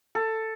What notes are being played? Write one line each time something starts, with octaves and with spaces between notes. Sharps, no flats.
A4